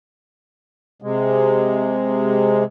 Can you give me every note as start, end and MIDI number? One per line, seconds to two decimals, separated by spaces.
1.02 2.64 48
1.02 2.64 56